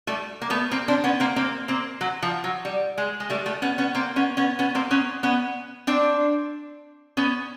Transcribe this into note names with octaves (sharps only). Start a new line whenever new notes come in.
G3 A3
A#3
A3 B3
A#3 C4
C4 D4
B3 C#4
A#3 C4
A#3 C4
A#3 C4
F#3
F3
F#3
G3
G#3
G#3
G3 A3
G3 A3
B3 C#4
B3 C#4
A#3 C4
B3 C#4
B3 C#4
B3 C#4
A#3 C4
B3 C#4
B3 C#4
C4 D4
B3 C#4